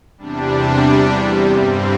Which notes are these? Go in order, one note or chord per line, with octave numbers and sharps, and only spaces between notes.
E2 C3 G3 D4
G2 D3 G3 C4